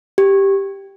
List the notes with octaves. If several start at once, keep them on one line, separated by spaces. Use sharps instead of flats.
G4